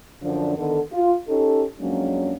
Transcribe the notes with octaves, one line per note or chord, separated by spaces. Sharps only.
F#2 D3 F3 D4
D3 D#3 B3 A4
F4
C#4 D#4 G4 A4
F2 F#3 G#3 A#3 C#4 D4